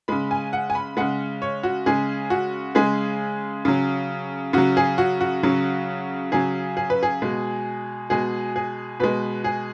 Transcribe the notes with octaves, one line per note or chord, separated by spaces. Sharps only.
C#3 G#3 B5
G#5
F#5
G#5
B5
C#3 G#3 F#5
C#5
F#4
C#3 G#3 G#4
F#4
C#3 G#3 G#4
C#3 F#3
C#3 F#3 F#4
G#4
F#4
F#4
C#3 F#3
C#3 F#3 G#4
G#4
B4
G#4
B2 G#3
B2 G#3 G#4
G#4
B2 G#3 B4
G#4